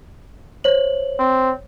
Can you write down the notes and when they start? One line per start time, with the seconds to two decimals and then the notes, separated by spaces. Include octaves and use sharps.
0.64 C5 C#5 F#7
1.19 C4